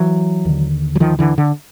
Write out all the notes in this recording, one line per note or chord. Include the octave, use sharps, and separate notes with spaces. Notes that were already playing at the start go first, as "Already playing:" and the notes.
Already playing: E3 F#3
D#2 D3
F#3
D#3 F3
D3 E3
D3